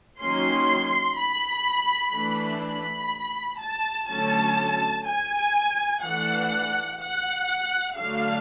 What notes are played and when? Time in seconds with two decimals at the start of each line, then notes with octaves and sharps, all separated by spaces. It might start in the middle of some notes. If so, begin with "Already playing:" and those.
0.20 D#3 F#3 A#3 C#4 C6
1.18 B5
2.14 E3 A3 D4
2.63 B5
3.60 A5
4.09 D3 F#3 A3 C#4 A5
5.06 G#5
6.03 E3 A3 D4 F#5
7.01 F#5
7.97 D3 F#3 A3 D4 F5